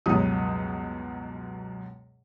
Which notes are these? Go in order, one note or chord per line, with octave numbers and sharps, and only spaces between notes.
C#2 F#2 B2 G3 D#6